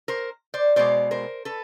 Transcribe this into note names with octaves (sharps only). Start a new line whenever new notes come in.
A#4 C5
C5 D5
B2 G#3 C5 D5
A#4 C5
A4 B4